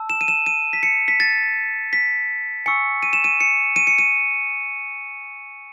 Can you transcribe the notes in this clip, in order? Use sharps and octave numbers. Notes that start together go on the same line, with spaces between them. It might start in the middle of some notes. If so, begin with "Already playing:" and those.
Already playing: A5 E6
E7
D#7
E7
D#7
B6
C#7
B6
A6
B6
G#5 C#6 E6 C#7
D#7
E7
D#7
C#7
D#7
C#7
D#7